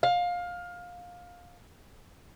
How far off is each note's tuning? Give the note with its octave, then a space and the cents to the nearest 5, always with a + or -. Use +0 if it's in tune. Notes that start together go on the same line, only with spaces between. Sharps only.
F5 +20